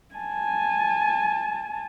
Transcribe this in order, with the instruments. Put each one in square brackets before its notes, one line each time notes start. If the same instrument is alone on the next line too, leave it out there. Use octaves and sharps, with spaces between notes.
[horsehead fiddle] G#5 A5